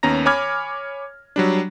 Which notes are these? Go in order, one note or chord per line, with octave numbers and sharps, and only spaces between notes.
D#2 B3 C#4 A#5 A#6
C#5 G#5 B5 D6 F6 G#6
F#3 G3 D4